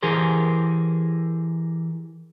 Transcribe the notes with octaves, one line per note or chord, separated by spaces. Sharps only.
E3 G4 G#4 A#4 C5